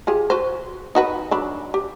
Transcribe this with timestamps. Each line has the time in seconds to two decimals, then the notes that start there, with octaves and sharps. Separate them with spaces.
0.07 F4 G4 G#4
0.30 F#4 B4 C5
0.95 D#4 F#4 B4
1.31 F#3 D4 B5
1.74 G4